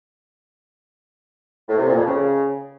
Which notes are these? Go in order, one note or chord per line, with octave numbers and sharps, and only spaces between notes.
A2
C3
A#2
F2
C#3